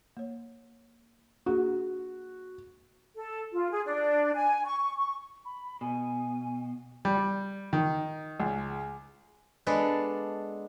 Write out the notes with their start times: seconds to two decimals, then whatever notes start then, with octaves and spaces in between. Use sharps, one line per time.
0.17 A#3 C#5
1.46 A#3 D4 F#4 G#4
3.16 A4
3.53 F4
3.70 G#4
3.85 D4
4.34 G#5
4.65 C#6
4.98 C#6
5.45 B5
5.81 B2 G#5
7.05 G3
7.73 D#3
8.40 C#2
9.67 G#3 B3 D4 A4 B4 D5